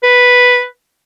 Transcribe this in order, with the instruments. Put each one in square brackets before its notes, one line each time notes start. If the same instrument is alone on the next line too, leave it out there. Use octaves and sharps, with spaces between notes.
[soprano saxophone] B4